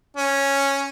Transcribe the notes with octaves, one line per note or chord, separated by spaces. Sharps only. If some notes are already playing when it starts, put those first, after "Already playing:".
C#4